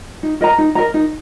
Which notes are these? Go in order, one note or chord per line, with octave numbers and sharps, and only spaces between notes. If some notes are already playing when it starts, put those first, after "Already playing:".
D#4
A#4 D#5 A#5
D#4
A#4 D#5 A#5
D#4